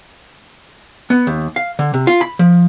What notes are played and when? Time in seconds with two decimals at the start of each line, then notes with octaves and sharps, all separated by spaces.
1.10 B3
1.27 D#2
1.56 F5
1.79 D3
1.94 C3
2.07 F4
2.21 B5
2.39 F3